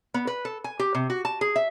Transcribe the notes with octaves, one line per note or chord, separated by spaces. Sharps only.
B3
B4
A4
G#5
G4
C3
F#4
A5
G#4
E5